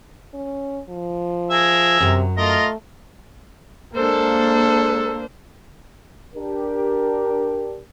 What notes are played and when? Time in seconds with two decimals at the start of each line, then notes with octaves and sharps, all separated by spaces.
0.34 C#4
0.89 F3
1.51 G#4 A#4 E5
2.00 F#2 C3 F#3
2.38 A3 F4 A#4 D#5
3.95 G#3 A#3 D4 A4 C5
6.35 D4 G4 A#4